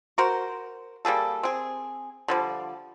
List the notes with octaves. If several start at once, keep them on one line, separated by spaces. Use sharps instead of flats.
F#4 A#4 C5
G3 A#3 G#4 A4
C4 G#4
D3 F3 G3